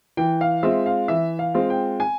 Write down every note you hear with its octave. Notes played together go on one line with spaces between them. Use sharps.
E3 G5
F5
G#3 C4 F4 E5
F5
E3 E5
F5
G#3 C4 F4
G5
G#5